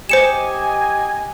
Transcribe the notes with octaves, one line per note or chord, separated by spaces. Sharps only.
G4 C5 D#5 G#5 C#7 E7